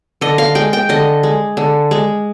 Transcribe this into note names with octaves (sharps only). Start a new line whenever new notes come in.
D3 D#5
F5
G#3 G5
G5
D3 D#5
G#3
D3
G#3